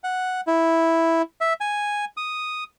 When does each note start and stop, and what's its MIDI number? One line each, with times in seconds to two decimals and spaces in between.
0.04 0.41 78
0.47 1.22 64
1.41 1.53 76
1.61 2.05 80
2.17 2.64 87